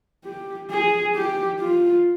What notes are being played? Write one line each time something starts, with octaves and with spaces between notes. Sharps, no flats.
G4
G#4
G4
F4